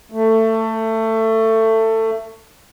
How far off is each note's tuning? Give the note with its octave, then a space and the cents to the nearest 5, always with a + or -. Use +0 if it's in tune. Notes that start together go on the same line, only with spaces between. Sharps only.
A3 +20